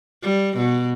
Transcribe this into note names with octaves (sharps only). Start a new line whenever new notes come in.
G3
B2